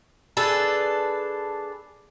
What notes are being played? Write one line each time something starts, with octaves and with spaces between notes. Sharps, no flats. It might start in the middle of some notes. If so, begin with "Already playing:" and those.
D4 G#4 A4 B4 D5